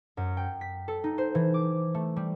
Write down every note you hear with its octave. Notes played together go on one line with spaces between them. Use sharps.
F#2
G5
B6
A4
D#4
C5
E3
D6
A3
G3